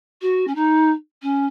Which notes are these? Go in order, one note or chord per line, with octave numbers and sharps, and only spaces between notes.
F#4
C#4
D#4
C#4